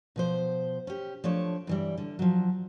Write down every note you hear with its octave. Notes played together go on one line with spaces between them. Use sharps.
B2 F3 C5
C#4 G4
F3 A3 D4 C#5
G2 E3 G3
D3
F3 F#3